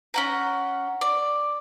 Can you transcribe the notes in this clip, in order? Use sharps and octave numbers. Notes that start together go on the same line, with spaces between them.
C#4 F#5 A#5
D5